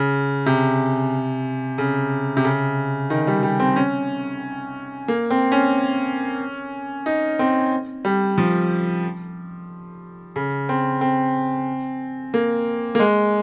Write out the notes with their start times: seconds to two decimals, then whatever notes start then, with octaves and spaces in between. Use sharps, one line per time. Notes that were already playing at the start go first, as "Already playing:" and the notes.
Already playing: C#3
0.46 C3
1.78 C#3
2.37 C3
2.45 C#3
3.10 D#3
3.27 G3
3.43 G3
3.60 C4
3.76 C#4
5.08 A#3
5.30 C4
5.52 C#4
7.06 D#4
7.39 C4
8.05 G3
8.38 F3
10.36 C#3
10.69 C4
11.01 C4
12.34 A#3
12.95 A#3
13.00 G#3